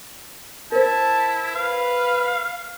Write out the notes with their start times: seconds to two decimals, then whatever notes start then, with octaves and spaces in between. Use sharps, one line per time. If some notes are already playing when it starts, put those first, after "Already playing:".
0.72 E4 A#4 C5 A5
1.55 B4 F5